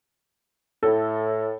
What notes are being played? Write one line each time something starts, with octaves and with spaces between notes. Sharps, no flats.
A2 A4